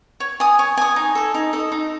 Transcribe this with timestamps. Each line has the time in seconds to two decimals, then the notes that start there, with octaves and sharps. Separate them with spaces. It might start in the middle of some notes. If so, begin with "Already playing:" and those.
0.20 C#5
0.40 G#5 D#6
0.59 C#5
0.77 G#5 D#6
0.96 D#4
1.15 A4 D#5
1.34 D#4
1.53 A4 D#5
1.72 D#4